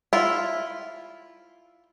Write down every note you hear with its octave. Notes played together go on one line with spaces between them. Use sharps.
E4 F4